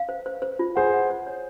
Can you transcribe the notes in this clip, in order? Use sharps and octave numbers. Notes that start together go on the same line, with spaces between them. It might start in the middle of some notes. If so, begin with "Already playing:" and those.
Already playing: F5
C5
C5
C5
F4
G#4 C5 F#5
F#5
C5
C#5